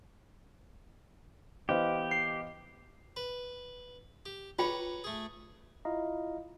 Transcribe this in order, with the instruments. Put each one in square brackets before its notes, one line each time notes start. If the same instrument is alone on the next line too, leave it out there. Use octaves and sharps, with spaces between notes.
[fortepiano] E3 B3 B4 [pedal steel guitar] G4 [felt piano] C5 D#5 F5
[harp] C7
[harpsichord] B4
G4
[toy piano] F4 G#4 G5 [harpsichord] B4 C#5 A#5
[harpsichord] A3 G#4
[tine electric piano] E4 F4 D#5 F5 A#5